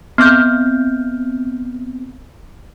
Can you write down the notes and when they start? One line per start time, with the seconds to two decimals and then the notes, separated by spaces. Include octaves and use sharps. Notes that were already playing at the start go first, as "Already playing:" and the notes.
0.18 B3 C4 F6 G6